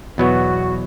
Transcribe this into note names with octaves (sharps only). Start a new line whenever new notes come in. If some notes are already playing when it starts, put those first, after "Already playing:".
E2 B2 F#3 B3 F#4